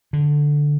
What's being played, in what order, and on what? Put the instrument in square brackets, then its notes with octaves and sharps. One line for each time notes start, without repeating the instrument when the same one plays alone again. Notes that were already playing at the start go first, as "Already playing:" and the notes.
[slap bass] D3